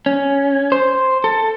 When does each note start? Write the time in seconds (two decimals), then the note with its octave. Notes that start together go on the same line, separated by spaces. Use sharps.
0.06 C#4
0.72 C5
1.24 A4